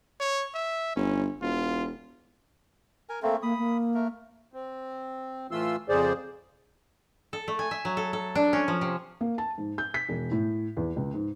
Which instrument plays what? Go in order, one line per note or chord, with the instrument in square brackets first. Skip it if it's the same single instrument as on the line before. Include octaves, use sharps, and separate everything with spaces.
[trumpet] C#5
E5
[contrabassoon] G1 [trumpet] C#4
[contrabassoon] E1 [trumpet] F4
[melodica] A#4 G#5
[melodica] A3 A#3 C4 [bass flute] A4
[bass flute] A#3 [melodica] B5 D#6
[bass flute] A#3
[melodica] A3 A#4
[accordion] C4
A2 E3 A3 F4 C6 E6
F2 C#3 G#4 C5 D5
[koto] A4
A3
G#5
E5
F#3
A4
A4
D4
C#4
F3
C3
[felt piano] A#3
A5
G#2
G6
B6
E1
A2
E2
C#2
G#2